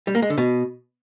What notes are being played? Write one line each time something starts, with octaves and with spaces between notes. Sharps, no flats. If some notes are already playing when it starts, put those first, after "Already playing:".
G3
A#3
G#3
D3
B2